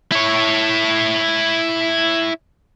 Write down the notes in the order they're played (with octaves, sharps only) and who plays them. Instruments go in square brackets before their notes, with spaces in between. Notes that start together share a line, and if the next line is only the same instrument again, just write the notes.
[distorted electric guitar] E4 C#5